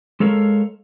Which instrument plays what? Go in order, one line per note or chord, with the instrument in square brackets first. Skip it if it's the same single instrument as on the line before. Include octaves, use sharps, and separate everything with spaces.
[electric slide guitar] G#3 A4 A#4 C#5 F5